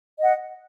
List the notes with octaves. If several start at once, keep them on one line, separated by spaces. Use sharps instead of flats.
D#5 F#5